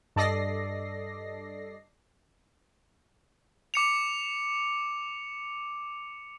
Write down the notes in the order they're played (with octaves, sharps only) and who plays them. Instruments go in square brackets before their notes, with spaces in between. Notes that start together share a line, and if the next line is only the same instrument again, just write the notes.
[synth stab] G2 A4 D5 D#5 A#6 C7
[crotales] D6 C#7 F7